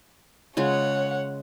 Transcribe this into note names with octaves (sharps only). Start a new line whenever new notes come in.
C#3 G#3 F4 C#5 F#5